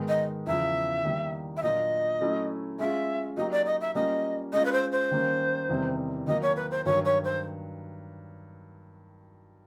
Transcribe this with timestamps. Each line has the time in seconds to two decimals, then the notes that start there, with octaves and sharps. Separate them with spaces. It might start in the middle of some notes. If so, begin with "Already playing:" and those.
Already playing: G#2 D#3 G#3 B3
0.08 D#5
0.47 E2 C#3 F3 E5
1.05 D#3 G3 A#3
1.57 E5
1.63 A#2 F#3 A#3 D4 F4 D#5
2.21 F#3 A3 C#4 E4
2.79 G#3 C#4 F4 G#4 E5
3.37 F#3 A#3 D#4 G4 D#5
3.52 D5
3.66 D#5
3.81 E5
3.95 G3 A#3 C#4 F4 A#4 D#5
4.53 G#3 C#4 F4 D#5
4.65 B4
4.73 C5
4.92 C5
5.11 D#3 G3 A#3 C#4
5.69 E2 C3 D#3 G3 C4
6.27 D#3 F#3 A#3 D#5
6.42 C#5
6.56 B4
6.71 C5
6.86 G2 D#3 F#3 C#5
7.05 C#5
7.24 C5